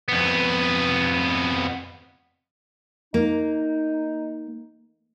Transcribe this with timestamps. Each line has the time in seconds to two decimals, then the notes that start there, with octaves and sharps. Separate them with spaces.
0.08 F2 B3
3.14 A#3 D#4